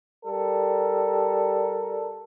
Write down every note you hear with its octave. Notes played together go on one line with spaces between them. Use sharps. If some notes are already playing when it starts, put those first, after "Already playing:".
G3 A4 A#4